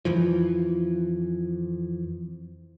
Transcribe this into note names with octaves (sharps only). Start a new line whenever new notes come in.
F2 E3 F3